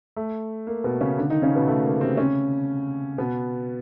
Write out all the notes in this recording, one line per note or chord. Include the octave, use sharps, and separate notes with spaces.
A3
A#3
B2 B3
C#3 C#4
D3 D4
D#3 D#4
C#3 C#4
B2 B3
A3
A#3
C3 C4
C#3 C#4
B2 B3